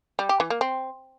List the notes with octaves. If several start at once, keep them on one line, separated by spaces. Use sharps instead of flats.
G3
G4
E3
A#3
C4